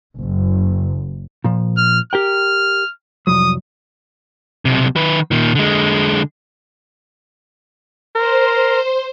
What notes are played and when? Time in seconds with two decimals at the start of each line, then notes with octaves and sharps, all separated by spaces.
0.19 F#1
1.44 A#2 F3
1.77 F6
2.13 G4 A#4 G5 F6
3.27 C2 F2 F#3 D#6
4.65 B1 C3
4.96 D#3 B4
5.31 A#2 D#3
5.55 D3 G#3
8.15 A#4 C5